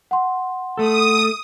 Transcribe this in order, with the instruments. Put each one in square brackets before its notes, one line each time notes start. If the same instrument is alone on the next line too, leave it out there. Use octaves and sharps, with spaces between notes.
[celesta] F#5 C6
[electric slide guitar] A3 A4 [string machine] D#6